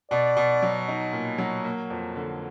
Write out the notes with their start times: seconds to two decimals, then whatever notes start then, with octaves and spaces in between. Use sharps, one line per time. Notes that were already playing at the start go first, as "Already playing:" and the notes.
0.11 B2 D5
0.37 B2
0.62 F#3
0.88 D#4
1.13 A#2
1.38 F#3
1.64 A#3
1.90 F2
2.16 D3